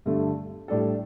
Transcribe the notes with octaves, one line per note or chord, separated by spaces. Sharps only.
G2 D3 A3
A2 G3 D4 A4